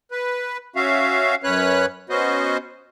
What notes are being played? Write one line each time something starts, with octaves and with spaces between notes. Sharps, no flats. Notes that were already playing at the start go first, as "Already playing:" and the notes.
B4
C#4 F#4 E5 F5
F#2 C#4 B4 C#5 F#6
B3 C#4 F#4 C5 D#5